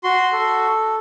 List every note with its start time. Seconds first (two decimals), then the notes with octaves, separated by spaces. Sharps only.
0.04 F#4 C6
0.32 A4